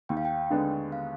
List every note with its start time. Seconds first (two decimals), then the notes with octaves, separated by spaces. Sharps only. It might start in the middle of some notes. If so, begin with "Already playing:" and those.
0.09 D#2 G5
0.17 F5
0.25 G5
0.50 D3 G#3 B3 D4
0.92 F5